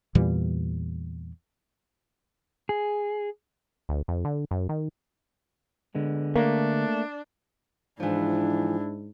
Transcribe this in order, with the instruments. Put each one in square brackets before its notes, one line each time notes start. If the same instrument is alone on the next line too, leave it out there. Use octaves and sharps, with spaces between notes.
[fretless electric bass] E2 A#2 E3 G3
[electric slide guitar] G#4
[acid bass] D2
F2
D3
F#2
D#3
[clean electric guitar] D3 G#3 B3
[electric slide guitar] A3 [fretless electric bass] A#3 [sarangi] D4
[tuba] G#2 [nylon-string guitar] E3 F3 [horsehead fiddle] D4 E4